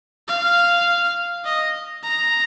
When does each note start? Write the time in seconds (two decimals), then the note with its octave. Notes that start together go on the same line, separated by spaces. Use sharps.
0.28 F5
1.45 D#5
2.04 A#5